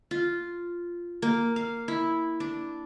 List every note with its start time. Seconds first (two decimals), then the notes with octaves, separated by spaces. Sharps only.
0.11 F4
1.22 A#3
1.56 F5
1.88 E4
2.40 D4